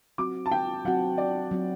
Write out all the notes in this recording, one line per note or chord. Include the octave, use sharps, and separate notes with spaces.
F#3 C4 F#4 D6
A5
G5
F#3 C4 F#4 F#5
D5
F#3 C4 F#4